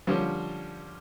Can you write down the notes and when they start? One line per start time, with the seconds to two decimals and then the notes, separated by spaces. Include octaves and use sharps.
0.07 D3 F3 G3 A#3 C#4